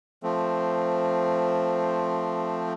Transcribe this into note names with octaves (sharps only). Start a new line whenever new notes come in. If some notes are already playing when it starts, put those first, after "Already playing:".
F3 A3 C4